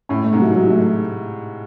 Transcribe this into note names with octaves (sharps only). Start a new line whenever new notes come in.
A2 C#4
A3
G#2 C3
F#3
F#3
A3